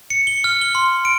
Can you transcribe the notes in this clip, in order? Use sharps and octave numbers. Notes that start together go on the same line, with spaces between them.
C#7
G7
F6
G7
C6
D7